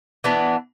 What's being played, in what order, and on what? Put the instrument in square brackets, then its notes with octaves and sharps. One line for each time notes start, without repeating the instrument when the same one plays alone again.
[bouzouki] E3 B3 D4